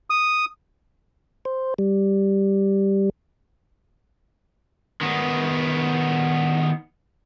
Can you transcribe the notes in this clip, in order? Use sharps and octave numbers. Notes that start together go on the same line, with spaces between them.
D#6
C5
G3
D#3 B3